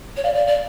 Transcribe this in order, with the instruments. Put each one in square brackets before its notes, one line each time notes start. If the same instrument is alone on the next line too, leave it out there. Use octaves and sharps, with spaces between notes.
[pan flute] C#5
[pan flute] D5 [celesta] F5
[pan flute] D5
D5